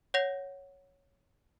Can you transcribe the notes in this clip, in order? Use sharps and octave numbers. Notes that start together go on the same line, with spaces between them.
C#5 F#5 G6 A#6 F7